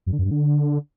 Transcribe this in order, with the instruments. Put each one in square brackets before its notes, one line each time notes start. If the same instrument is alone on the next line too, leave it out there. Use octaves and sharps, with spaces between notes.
[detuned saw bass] F#2
D3
F#2
G2
D3